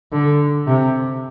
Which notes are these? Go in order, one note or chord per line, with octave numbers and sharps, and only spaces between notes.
D3
C3